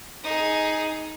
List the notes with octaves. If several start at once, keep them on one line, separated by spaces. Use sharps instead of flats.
D#4 G#4